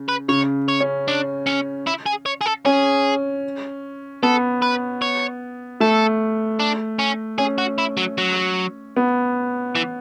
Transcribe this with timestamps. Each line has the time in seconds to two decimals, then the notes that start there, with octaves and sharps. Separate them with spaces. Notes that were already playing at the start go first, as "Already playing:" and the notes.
Already playing: C#3
0.09 B4
0.29 C#3 C#5
0.68 C#5
0.81 C#4
1.08 D4
1.46 C#4
1.87 E4
2.06 G#4
2.26 C#5
2.41 G#4
2.46 A4
2.65 C#4 G#4
4.23 B3 A4
4.62 B4
5.02 C#5
5.80 A3 A4
6.60 D4
6.99 C#4
7.38 C#4 G#4
7.58 F#4
7.78 E4
7.97 F#3
8.18 F#3
8.97 B3
9.75 E3